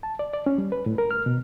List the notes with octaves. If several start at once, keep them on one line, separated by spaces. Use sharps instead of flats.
A5
D5
D5
C#4
G3
B4
A2
A#4
F6
B2